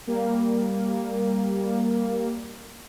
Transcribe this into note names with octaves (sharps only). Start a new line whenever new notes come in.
G3 A#3